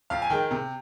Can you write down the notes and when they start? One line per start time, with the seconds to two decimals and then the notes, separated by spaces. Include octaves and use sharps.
0.10 F2 F5
0.22 G#5
0.30 D#3 G#3 G5
0.51 C3